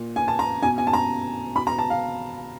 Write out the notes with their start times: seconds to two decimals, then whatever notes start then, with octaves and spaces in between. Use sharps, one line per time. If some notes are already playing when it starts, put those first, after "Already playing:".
Already playing: A#2
0.16 G#5
0.28 A5
0.39 A#5
0.63 B2 G#5
0.78 G#5
0.87 A5
0.93 A#5
1.55 B2 B5
1.67 A#5
1.79 A5
1.90 F5